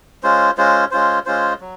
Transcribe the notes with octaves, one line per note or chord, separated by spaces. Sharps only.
G#3 C#4 F4 C5
G#3 C#4 F4 C5
G#3 C#4 F4 C5
G#3 C#4 F4 C5
F#3